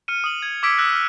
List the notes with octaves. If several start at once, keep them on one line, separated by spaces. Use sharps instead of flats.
F6 C#7 D#7
D#6 F#7
G#6
D6 E6 G#6 B6 C#7 D7
E6 F#6 A#6
F6